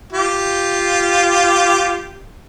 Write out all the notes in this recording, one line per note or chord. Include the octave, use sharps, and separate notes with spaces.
F4 G4